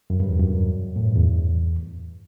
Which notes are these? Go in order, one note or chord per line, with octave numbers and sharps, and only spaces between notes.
F#2
G2
E2
F#2
A2
G2
E2